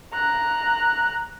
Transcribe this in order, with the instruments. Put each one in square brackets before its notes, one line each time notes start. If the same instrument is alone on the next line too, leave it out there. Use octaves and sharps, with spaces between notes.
[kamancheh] A#5 F#6